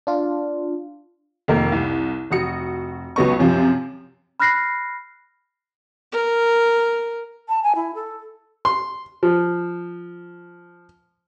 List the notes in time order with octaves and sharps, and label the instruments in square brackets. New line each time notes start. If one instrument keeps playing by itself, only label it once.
[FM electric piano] D4 F4
[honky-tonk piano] F1 D#3 A3 A#3
C2
F1 F#4 D#6 C#7
C#2 F#3 B3 D#5 C#6
F#2 C3 F3
[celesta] B5 F6 F#6 A#6 C7
[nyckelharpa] A#4
[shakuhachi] A5
G#5
E4
A4
[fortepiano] C6
F3